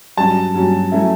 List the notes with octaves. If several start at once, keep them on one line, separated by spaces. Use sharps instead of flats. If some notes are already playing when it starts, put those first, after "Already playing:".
G2 F#3 C#4 F#4 A5
G2 F#3 C#4 F#4
F#3 A3 C#4 E4